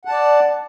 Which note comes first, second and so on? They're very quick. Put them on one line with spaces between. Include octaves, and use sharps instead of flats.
F#5 A5 D5